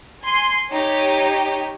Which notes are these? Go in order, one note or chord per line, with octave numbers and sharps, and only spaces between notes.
G#5 C6
D#4 G4 C#5